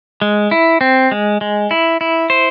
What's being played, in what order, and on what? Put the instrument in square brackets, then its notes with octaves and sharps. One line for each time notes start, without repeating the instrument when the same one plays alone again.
[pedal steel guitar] G#3
E4
C4
G#3
G#3
E4
E4
C5